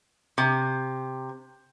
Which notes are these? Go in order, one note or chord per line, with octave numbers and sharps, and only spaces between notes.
C3